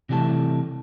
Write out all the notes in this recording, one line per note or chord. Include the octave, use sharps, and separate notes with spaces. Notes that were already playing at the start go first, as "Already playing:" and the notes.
C3 E3 G3 A3 A5